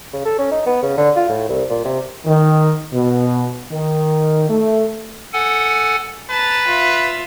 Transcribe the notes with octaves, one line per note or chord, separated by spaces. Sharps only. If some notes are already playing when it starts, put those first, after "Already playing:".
C#3
A4
C#4
D#4
B3
C#3
D3
F4
A2
C2
A#2
C3
D#3
B2
D#3
A3
A4 F#5 G#5
B4 A5 A#5
F4 E5